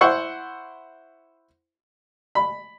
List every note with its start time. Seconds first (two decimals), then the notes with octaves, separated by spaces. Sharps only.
0.01 E4 C5 F#5 C#6 E6
2.35 B5